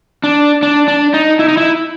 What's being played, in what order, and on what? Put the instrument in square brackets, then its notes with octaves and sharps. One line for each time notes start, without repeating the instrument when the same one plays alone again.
[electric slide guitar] D4
D4
D4
D#4
E4
D#4
E4